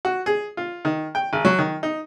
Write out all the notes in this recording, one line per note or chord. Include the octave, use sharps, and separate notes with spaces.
F#4
G#4
F4
D#3
G5
G#1
F#3
D#3
D#4